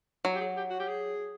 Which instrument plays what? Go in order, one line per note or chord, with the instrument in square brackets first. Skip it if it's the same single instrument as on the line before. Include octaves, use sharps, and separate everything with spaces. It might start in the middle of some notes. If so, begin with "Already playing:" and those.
[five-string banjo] F#3
[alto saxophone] G4
G#4
G4
F#4
G4
G#4